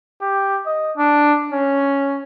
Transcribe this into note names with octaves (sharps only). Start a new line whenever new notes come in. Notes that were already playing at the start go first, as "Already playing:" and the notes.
G4
D#5
D4
C#4